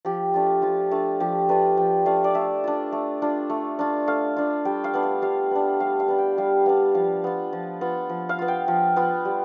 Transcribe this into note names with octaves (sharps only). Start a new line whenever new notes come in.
F3 G4
A3 D4 F4
F3 F4
A3 D4 F4
F3 G4
A3 D4 F4 B4
F3 G5
A3 D4 F4 F5
D5
A3 E5
D4 F4
A3
D4 F4
A3
D4 F4
A3 F5
D4 F4
G3 G5
F5
B3 D4
F5
G3 F5
B3 D4
G3 F5
F5
B3 D4
G5
G3 F5
B3 D4 F5
F3 F5
B3 F4
F3
B3 F4
F3
F5
B3 F4
G5
F3
B3 F4
G3